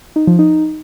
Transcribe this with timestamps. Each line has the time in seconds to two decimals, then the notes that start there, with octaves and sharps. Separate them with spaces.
0.16 D#4
0.27 F3
0.39 D#4